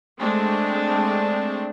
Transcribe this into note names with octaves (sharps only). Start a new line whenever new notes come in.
G#3 A3 C4 D4